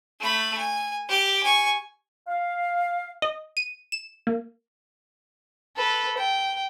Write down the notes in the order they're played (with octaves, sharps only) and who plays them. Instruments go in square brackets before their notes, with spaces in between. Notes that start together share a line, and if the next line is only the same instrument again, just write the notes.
[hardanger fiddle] A3 B5
G#5
G4 D6
G#5 C#6
[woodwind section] F5
[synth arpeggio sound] D#5
D#7
E7
A#3
[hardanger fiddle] A4 B4
G5